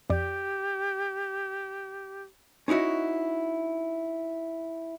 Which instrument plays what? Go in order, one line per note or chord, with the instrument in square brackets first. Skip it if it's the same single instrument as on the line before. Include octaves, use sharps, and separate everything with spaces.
[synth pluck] F2 D5 [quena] G4
[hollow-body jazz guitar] C#4 D#4 E4 F#4 D#5